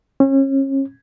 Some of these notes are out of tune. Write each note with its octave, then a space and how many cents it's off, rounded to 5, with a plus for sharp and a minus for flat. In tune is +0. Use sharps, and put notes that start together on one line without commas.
C#4 -35